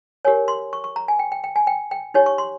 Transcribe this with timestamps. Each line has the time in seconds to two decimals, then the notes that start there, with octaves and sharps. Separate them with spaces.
0.25 G4 A#4 C#5 G#5
0.48 C6
0.73 C#6
0.84 C#6
0.96 A#5
1.08 G#5
1.19 G5
1.32 G5
1.44 G5
1.56 G#5
1.67 G5
1.91 G5
2.14 D#4 G4 C#5 G#5
2.26 C#6
2.38 C6